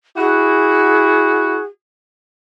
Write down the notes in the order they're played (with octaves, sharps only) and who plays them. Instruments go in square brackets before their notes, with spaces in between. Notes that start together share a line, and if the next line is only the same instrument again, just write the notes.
[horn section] E4 F#4 [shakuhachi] G#4